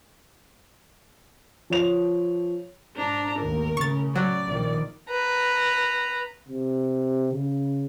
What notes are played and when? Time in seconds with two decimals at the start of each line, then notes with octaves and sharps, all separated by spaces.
1.70 F3 C#5 F7
2.96 G#2 D4 A#5
3.38 A1 D#2 A#4
3.77 A2 C#3 C#4 C#6 A6
4.16 F#3 D5
4.48 A#1 D#3
5.09 B4 A#5
6.48 C3
7.33 C#3